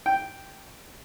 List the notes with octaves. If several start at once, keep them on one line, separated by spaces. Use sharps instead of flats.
G5